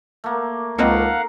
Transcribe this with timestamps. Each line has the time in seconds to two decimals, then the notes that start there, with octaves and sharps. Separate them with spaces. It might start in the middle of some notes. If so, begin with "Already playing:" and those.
0.24 A3 A#3
0.79 C#2 A#3 C4 D#4 A4 A#4 F5 F#5